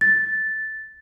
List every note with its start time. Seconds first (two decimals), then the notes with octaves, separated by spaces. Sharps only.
0.01 A6